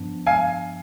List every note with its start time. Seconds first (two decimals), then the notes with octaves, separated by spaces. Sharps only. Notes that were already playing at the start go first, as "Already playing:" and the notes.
Already playing: G2 F3 B3 D4
0.26 F5 G#5